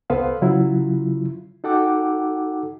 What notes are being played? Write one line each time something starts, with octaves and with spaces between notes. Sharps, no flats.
C2 B3 A4 B4 C5 F5
C#3 F#3 E4 F4
D#4 F#4 A4 F#5 G5 D6